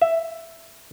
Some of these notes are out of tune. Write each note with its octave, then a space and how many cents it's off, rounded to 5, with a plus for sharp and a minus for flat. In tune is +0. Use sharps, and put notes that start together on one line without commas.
E5 +5